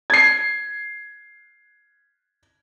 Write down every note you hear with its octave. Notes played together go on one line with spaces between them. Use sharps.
G#6 C7